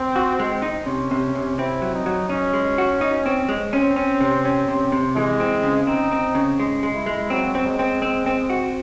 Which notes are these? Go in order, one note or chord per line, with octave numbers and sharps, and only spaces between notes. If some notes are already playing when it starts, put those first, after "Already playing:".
Already playing: C4
F#4
G#3
D#4
C3 C#4
C3
C3
C4 E4
F#3
D#4
F#3
C#4 D#4
G#3
F#4
D#4
C4
G#3
C4 C#4
C#4
C3
C#4
C3
C3
E3 G#3
C4
C#3
C4 D#4
C4
C#3
G#3
G#3
E4
G#3
F#3 C4
C4
G#3
C4
C4
C4
F#4